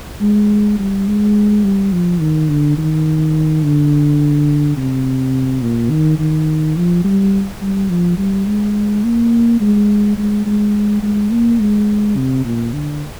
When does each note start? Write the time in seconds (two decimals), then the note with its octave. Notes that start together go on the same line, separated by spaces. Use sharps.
0.21 G#3
0.79 G3
1.07 G#3
1.64 G3
1.93 F3
2.20 D#3
2.49 D3
2.78 D#3
3.63 D3
4.77 C3
5.62 A#2
5.90 D#3
6.19 D#3
6.76 F3
7.04 G3
7.61 G3
7.90 F3
8.18 G3
8.47 G#3
9.04 A#3
9.61 G#3
10.18 G#3
10.46 G#3
11.03 G#3
11.32 A#3
11.60 G#3
12.16 C3
12.45 A#2
12.74 D3